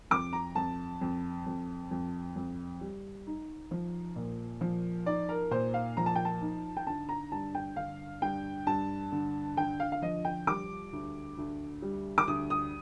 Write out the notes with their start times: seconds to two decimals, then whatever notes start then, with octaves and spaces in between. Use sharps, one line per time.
0.11 F2 D6
0.33 A#5
0.55 F2 A5
1.01 F2
1.46 F2
1.91 F2
2.36 F2
2.81 G3
3.27 D#4
3.71 F3
4.16 A#2
4.61 F3
5.06 D#4 D5
5.29 A#4
5.51 A#2 C5
5.74 F5
5.97 F3 A#5
6.06 A5
6.15 G5
6.25 A5
6.41 D#4
6.77 G5
6.87 D3 A5
7.09 A#5
7.32 G2 A5
7.55 G5
7.76 D3 F5
8.22 G2 G5
8.67 G2 A5
9.12 D3
9.57 D3 G5
9.80 F5
9.92 F5
10.02 F3 D#5
10.25 G5
10.47 G3 D6
10.93 D2
11.38 D2
11.82 G3
12.18 D6
12.28 D2 D#6
12.50 D#6